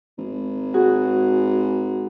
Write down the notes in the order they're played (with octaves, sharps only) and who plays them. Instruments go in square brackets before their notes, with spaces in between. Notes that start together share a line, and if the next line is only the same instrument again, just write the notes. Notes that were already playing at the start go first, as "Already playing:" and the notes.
[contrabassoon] G#1
[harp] F#4 G#4